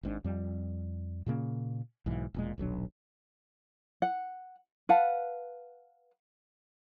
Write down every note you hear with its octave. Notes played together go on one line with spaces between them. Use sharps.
G#1 G#2 C4 D4
F2 G3
A#2 C#3 A#3 C#4
B1 G#2 E3
E1 A#2 G#3
D#1 B1 F#3 D4
F#5
B4 F5 F#5 A5